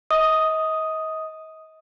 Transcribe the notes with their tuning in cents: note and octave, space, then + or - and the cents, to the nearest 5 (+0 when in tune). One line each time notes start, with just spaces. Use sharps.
D#5 +35 D#6 +0